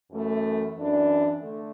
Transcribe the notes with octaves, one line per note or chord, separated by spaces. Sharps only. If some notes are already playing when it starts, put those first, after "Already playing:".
F#2 E3 A3
F#2 E3 D4
D3 A3